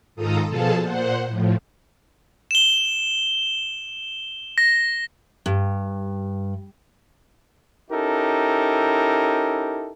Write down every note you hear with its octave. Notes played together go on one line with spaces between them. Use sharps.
G#2 D#3 F4 A4 A#5 D#6
B2 F3 G#4 A4 F5 A5
A#2 C5 F#5
A2 F3
E7 G7
A#6
G2
C#4 D#4 E4 G4 A4 A#4